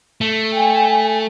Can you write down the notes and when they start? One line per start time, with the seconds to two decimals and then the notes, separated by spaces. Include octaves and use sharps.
0.21 A3
0.53 G5 G#5